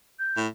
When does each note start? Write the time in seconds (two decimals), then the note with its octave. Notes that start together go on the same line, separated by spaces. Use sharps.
0.19 G6
0.37 A2